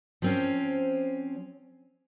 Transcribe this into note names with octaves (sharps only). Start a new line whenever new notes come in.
F3 C4 C#4